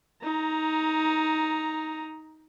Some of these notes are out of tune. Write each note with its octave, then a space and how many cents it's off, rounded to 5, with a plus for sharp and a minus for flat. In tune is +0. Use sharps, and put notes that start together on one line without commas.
D#4 +15 A#5 +0